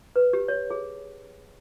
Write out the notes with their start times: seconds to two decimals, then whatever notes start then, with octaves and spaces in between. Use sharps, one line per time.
0.16 B4
0.33 G4
0.48 C#5
0.70 G#4